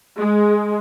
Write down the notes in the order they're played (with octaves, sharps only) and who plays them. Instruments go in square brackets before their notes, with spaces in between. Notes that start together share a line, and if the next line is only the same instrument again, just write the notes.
[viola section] G#3